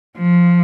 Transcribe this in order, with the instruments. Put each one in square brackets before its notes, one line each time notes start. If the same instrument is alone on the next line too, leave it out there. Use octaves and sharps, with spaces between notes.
[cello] F3